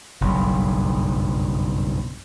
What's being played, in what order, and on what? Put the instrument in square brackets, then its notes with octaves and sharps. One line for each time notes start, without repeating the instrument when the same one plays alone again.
[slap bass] F#1 B1 G2